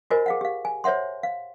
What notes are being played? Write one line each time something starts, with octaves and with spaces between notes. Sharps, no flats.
F4 F#4 A#4 C5 D#5 G#5
G#4 F5 F#5
G4 F5
G#5
C5 C#5 E5 F#5 C6
F5